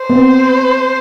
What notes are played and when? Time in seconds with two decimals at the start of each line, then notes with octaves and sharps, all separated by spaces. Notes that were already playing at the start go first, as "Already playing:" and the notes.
Already playing: C5
0.10 B3
0.15 C4